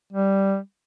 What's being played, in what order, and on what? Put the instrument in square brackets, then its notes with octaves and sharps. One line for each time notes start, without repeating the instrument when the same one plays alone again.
[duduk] G3